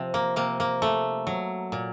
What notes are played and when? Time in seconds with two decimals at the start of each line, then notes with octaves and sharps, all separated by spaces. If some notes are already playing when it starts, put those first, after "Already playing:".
Already playing: C3 F3
0.14 A#3
0.36 C3 A#3
0.60 A#3
0.82 A3
1.27 F#3
1.72 A#2